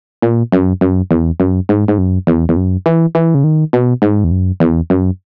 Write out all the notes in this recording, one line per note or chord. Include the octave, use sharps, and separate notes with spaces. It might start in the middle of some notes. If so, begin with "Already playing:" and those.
A#2
F#2
F#2
E2
F#2
G#2
G#2
F#2
E2
E2
F#2
E3
E3
C#3
D#3
B2
G#2
E2
F#2
E2
F#2